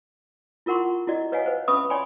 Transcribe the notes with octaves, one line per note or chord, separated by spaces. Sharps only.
E4 F4 A#4 F#5 C6 C#6
E4 F#4 D5 D#5
B4 C#5 D#5 F5 F#5 G#5
B4 C5
C#4 B4 E5 B5 C#6 D#6
C#5 D5 G5 G#5 B5 C6